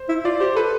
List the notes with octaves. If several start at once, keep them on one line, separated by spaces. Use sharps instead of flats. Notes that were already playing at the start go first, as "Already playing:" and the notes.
Already playing: C5
E4
F4 D5
G4 C5
A4 B4